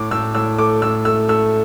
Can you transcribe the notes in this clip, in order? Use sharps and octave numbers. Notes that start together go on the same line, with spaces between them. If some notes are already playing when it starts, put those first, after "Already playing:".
Already playing: A2 D6
A2 E6
A2 E6
A3 D6
A2 E6
A3 E6
A3 E6